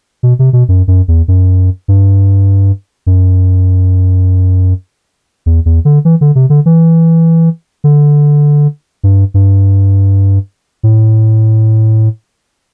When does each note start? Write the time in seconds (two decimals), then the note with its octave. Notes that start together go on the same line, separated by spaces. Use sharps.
0.23 B2
0.39 C3
0.53 B2
0.69 F#2
0.88 F#2
1.08 E2
1.28 F#2
1.88 G2
3.06 F#2
5.46 E2
5.66 E2
5.85 D3
6.05 E3
6.21 D3
6.35 C3
6.50 D3
6.66 E3
7.84 D3
9.03 G2
9.34 G2
10.83 A2